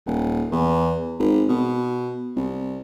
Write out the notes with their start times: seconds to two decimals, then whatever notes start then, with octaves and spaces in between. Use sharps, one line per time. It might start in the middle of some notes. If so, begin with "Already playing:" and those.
0.06 D#1
0.52 E2
1.20 G#1
1.49 B2
2.36 C2